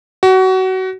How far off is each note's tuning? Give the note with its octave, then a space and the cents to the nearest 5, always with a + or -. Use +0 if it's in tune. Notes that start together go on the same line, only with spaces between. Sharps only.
F#4 +25